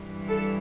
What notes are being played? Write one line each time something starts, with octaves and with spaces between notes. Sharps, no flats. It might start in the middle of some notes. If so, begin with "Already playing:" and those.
Already playing: G2 E3 G3
A4